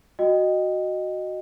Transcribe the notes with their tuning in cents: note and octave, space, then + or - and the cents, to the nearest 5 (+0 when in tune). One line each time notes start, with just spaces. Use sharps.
F#4 +0 D#5 -10 G5 +0